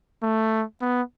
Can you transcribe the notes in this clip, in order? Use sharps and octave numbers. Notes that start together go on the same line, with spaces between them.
A3
B3